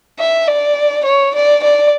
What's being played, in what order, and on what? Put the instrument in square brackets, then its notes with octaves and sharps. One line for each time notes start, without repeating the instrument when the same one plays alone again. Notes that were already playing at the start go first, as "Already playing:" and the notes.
[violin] E5
D5
C#5
D5
D5